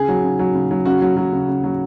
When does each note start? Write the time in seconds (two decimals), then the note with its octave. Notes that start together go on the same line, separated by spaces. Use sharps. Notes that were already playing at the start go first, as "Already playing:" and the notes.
Already playing: C#3 G#4
0.09 F#3
0.24 C#3
0.39 F#3
0.55 C#3
0.71 F#3
0.86 C#3 F#4
1.02 F#3
1.17 F#3
1.32 C#3
1.48 C#3
1.64 F#3